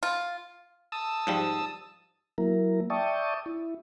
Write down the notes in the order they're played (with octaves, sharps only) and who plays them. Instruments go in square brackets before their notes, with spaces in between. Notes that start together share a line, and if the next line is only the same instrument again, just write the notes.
[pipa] F4
[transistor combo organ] A5 D#6 E6
[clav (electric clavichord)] G#2 F3 G3
[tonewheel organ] F#3 A#3 E4 A#4
D5 E5 G5 A5 C#6 D#6
E4